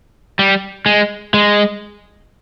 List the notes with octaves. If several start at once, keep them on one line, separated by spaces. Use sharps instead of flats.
G3
G#3
G#3